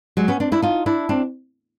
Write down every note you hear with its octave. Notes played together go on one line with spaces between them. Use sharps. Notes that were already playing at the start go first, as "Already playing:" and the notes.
F#3 G#3
B3 C#4
C4 D4
D4 E4
D#4 F4
D4 E4
C4 D4